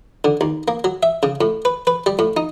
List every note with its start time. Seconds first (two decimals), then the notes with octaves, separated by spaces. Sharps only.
0.25 D3
0.41 D#2
0.68 A#3
0.84 F#3
1.03 E5
1.23 C#3
1.41 A2
1.65 B4
1.87 B4
2.06 G3
2.19 A2
2.37 D#4